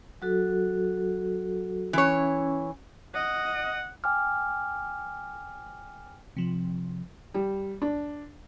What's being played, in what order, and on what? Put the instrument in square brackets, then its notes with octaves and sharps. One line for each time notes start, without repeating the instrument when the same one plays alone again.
[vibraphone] F#3 F#4 A4
[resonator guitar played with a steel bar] E3 C#5 [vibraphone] C#4
[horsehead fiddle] D#5 [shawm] F#5
[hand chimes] G5 G#5 D6 F6
[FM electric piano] C3 F3
[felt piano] G3
D4